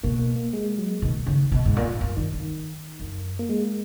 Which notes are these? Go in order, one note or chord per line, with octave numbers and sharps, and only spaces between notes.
B2 A#3
A#3
A#3
G#3
F#3
B2 D#3
C#3
B2
G#2
A#2
F#2
F#2 D#3
F#2
F#2
A#3
G#3